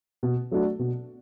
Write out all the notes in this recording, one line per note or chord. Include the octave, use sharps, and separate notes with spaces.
B2
F#3 A3 D4 F#4
B2